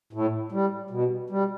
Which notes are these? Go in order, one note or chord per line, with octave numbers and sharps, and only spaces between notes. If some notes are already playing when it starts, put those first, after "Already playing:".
A2
G3
B2
G3